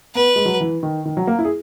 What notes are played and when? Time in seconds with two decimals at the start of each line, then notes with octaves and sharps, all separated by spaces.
0.15 B3 B4
0.36 G#3
0.45 F#3
0.60 E3
0.83 D#3
1.05 D#3
1.17 F#3
1.27 A#3
1.39 E4
1.45 G#4